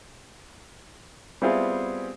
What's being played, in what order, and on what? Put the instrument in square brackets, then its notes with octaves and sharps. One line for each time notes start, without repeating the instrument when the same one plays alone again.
[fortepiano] G3 B3 C4 E4 F4 G#4